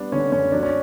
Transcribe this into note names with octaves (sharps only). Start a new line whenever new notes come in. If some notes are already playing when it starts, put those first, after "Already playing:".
Already playing: G3 B3 D4
D3 C#4
F#2 C#4
F#3 D4
C#4